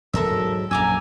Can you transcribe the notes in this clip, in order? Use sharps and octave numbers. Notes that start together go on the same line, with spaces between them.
E2 D3 A4 A#4 E5
G#2 F#3
A#1 F#2 G#5 A#5 D6 E6